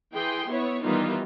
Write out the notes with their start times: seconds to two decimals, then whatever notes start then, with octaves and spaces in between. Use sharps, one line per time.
0.13 E3 G#4 G5 C6
0.49 B3 E4 C#5
0.84 D#3 E3 G3 B3 D#4 F4